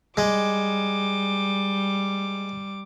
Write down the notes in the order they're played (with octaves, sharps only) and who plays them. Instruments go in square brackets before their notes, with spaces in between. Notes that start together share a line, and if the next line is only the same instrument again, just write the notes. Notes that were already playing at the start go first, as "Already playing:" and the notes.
[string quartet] G3 [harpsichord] G#3 [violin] D6